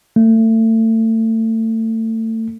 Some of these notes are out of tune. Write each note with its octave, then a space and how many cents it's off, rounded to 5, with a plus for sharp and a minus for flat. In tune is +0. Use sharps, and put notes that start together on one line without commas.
A3 +30